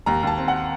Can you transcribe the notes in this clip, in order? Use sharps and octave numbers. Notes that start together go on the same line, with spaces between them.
D#2 A#5
D#2 A5
C4
F#5